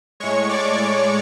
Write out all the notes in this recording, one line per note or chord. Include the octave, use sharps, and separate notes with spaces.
A2 G#3 C#5 C#6
D5 D6
D5 D6